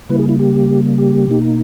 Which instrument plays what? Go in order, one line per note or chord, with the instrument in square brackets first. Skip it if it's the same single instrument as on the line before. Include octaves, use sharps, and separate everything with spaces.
[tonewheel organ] C#3 G3 A#3 E4 B4
G#4
E4
G4
G4
B2 A#3 D#4